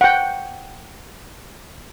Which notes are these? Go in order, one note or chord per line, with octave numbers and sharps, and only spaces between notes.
F#5 G5